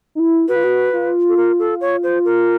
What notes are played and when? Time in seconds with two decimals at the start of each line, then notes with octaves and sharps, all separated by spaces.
0.15 D#4
0.19 E4
0.48 F#4 B4
0.56 F4
0.64 F#4
0.93 F4
1.29 A4
1.37 A#4
1.59 A4
1.81 C#5
2.03 C5
2.25 A#4